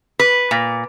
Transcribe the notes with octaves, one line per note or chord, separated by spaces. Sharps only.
B4
A#2